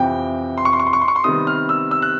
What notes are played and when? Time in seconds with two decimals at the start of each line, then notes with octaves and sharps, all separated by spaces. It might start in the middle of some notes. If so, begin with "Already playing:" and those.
Already playing: F2 C3 E3 G5
0.58 C6
0.65 C#6
0.73 C6
0.80 C#6
0.87 C6
0.93 C#6
1.01 C6
1.08 C#6
1.16 C6
1.24 C3 D#3 G3 B3 D#6
1.47 F6
1.69 E6
1.91 E6
2.02 F#6